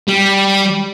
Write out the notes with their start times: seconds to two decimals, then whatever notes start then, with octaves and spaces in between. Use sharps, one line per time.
0.08 G3